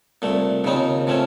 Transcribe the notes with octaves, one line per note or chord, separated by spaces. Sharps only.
C2 A#2 A3
D#2 C#3 F3 C4 D#4
C3 F3 A3 C#4